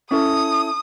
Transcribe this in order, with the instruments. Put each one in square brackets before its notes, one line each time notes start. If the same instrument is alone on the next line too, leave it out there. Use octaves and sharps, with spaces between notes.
[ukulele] C#4 E4 A4 [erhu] D#6